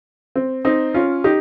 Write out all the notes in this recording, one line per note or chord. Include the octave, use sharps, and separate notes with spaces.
C4
C4 D#4
C#4 F4
D#4 G4